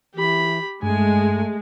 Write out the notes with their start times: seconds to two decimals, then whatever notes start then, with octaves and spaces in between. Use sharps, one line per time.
0.15 E3 G4 B5
0.83 G2 G#3 A3 G#5